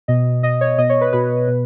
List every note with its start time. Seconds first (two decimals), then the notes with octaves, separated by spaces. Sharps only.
0.08 B2 D#5
0.43 B2 D#5
0.61 C#5
0.78 B2 D#5
0.90 C#5
1.01 B4
1.13 B2 B4
1.48 B2